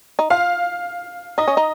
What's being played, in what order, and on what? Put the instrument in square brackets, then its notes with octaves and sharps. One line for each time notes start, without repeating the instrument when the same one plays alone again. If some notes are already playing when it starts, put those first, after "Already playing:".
[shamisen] D#4
[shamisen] F4 [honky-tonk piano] F5
[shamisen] D#4 [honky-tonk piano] D#5
[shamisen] C#4
D#4